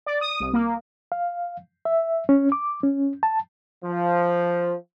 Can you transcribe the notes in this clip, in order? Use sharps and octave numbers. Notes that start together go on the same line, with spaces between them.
D5
D#6
C2
A#3
F5
E5
C#4
D6
C#4
A5
F3